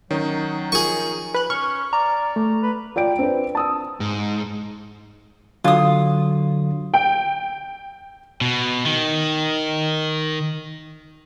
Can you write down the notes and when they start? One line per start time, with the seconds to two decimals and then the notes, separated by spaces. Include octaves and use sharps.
0.11 D#3 F#3 C#4 D#4
0.72 F3 G#4 A#4 C#6 D#7
1.35 B4 F#6
1.50 C#4 C#6 F6
1.93 D5 A#5
2.36 A3
2.62 B4
2.96 F4 D5 G5 D7
3.19 C4 D4 B4
3.55 A5 D#6 E6
4.00 G#2
5.64 D3 F#3 F4 D#6
6.94 G5
8.41 B2
8.86 D#3